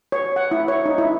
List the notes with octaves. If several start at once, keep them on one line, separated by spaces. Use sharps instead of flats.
C#5
F#5
E4
C#5
D#4
E4